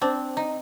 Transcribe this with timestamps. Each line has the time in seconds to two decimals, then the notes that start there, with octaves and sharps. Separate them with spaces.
0.01 C4 D4
0.37 D#4